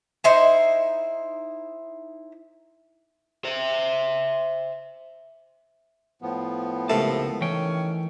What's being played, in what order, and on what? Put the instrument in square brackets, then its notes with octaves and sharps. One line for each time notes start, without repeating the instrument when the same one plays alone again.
[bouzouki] D#4 E4 C5
[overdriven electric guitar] C5 E5
[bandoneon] A2 F3 B3
[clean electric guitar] C#2 A#4 A5 [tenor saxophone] C3 [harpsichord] A3
[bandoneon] D#3 [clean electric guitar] E3 G5 [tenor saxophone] C#4